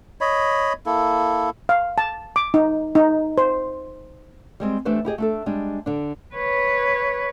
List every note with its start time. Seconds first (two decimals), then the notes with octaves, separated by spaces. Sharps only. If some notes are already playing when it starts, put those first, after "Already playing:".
0.21 C#5 D#5 B5
0.86 A#3 E4 A4
1.69 F5
1.98 A5
2.36 D6
2.54 D#4
2.95 D#4
3.38 C5
4.60 G3 G#3 C4
4.85 E3 A3 D4 G4 B4 C5
5.05 E4 G4 G#4 D#5
5.18 A3 D4 A4
5.46 G3 G#3 D4
5.86 D3 D4
6.35 B4 C#5